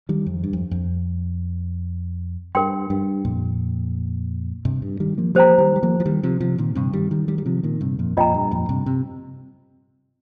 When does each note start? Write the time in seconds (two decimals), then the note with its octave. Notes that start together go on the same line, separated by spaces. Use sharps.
0.09 D#3 G3
0.26 F2
0.44 G2
0.53 F2
0.71 F2
2.55 G2 A#4 G5 C6
2.90 G2
3.25 F2 A#2
4.65 G2 C3
4.82 G2
5.00 D#3 G3
5.18 F3 A#3
5.35 F3 A#3 G4 C5 G5 A#5
5.58 D#3 G3
5.76 G3
5.83 F3 A#3
6.00 F3
6.05 D#3 G3
6.23 C3 F3
6.40 C3 F3
6.58 A#2 D#3
6.75 G2 C3
6.93 D#3 G3
7.11 D#3 G3
7.28 D#3 G3
7.38 G3
7.46 C3 F3
7.63 A#2 D#3
7.81 G2 C3
7.99 F2 A#2
8.17 F2 A#2 F4 D#5 G5 A#5
8.34 G2
8.51 F2 A#2
8.69 G2 C3
8.86 C3